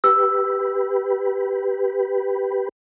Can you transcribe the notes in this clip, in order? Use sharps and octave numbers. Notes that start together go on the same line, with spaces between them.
G4 B4 E6